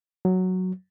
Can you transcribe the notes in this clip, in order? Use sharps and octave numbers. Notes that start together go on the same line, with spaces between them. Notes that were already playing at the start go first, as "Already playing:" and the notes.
F#3